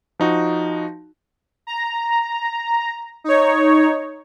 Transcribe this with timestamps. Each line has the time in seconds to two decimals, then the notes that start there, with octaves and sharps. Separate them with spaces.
0.19 F3 D#4 F#4
1.67 A#5
3.24 D#4 C#5